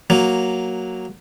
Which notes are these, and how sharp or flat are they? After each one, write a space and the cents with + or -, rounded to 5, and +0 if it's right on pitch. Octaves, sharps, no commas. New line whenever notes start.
F#3 +0 A#3 +0